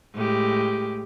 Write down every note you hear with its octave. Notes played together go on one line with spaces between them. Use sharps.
A2 G#3 G4